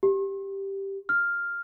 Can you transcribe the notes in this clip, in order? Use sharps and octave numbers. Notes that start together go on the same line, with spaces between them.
G4
F6